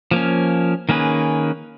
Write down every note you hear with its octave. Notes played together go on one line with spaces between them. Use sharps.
F3 A#3 C#4
D#3 A#3 C#4 G#4 B4